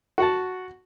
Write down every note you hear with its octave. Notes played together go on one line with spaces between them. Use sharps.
F#4 F#5 A5